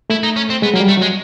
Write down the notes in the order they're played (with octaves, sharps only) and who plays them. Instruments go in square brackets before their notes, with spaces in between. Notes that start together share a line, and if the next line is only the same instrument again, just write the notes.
[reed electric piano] A3 [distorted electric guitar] E4
[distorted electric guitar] D#4
C#4
C4
[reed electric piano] G#3 [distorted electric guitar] B3
[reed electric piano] F#3 [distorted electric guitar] A#3
[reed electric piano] G3
[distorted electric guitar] A3
[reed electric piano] F#3 [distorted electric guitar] G#3